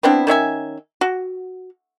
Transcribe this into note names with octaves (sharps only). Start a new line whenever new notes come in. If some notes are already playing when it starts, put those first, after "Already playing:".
B3 C4 D4 E4
D#3 C#4 E5 G#5
F#4